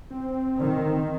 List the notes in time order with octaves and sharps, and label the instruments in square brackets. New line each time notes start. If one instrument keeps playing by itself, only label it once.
[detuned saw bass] C4
[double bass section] D#3